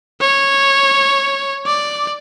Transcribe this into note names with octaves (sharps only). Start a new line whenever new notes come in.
C#5
D5